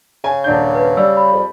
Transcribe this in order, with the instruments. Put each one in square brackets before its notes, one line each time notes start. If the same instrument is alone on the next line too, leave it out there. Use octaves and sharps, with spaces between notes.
[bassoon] C#3 [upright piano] G#5
[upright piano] D#1 D4 G6
[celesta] B4
[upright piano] G3 [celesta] E6
[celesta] B5
[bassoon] F2